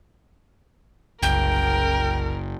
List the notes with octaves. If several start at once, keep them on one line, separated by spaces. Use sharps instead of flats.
F#1 C2 A#4 G5